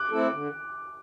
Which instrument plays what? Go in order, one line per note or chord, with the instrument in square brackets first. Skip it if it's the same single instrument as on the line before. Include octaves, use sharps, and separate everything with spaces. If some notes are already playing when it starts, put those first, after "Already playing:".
Already playing: [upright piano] D6 F#6
[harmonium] A3 C4 E4 A4
D3